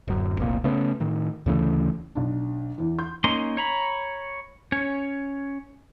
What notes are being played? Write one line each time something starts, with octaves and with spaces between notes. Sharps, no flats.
D1 F#2
F1 C2 A#2 A#3
C#3 A3 B3 C#4
A2 D#3
D2 C#3 E3 A3
B1 D4
E2 E3
C6 G6
A#3 C#4 D#4 C6
C#5 A#5 B5
C#4 C#5